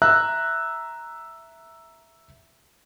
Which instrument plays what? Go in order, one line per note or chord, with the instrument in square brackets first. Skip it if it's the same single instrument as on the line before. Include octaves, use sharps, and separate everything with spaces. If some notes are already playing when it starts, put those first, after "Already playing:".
[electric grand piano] E5 A#5 E6 F#6